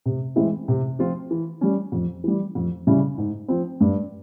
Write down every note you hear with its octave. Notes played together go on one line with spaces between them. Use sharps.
C3
E3 G#3 C4 E4
C3
F3 C4 F4
E3
G3 C#4
F2
E3 G3
F2
C#3 G3 C#4 E4
G#2
F3 C4
G2